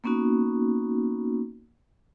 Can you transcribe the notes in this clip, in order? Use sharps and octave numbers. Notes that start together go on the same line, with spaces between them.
A#3 B3 C#4 D#4 F#4